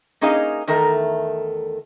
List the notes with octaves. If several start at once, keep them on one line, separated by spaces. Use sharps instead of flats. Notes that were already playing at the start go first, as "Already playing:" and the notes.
A#3 C#4 D#4 G#4 D#5 F5
E2 D#3 A3 A#4